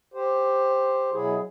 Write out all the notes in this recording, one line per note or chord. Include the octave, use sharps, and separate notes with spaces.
G4 C5
B2 F#3 E4 G#4